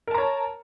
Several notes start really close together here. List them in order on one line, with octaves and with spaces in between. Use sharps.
A#4 A5 A#5 C#5